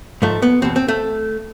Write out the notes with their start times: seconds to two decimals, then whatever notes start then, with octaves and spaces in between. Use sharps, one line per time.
0.22 G#2 F3 A3
0.42 B3
0.62 E2 B2 C4
0.76 C4
0.88 A3